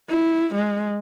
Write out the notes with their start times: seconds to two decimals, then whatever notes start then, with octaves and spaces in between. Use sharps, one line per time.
0.10 E4
0.55 G#3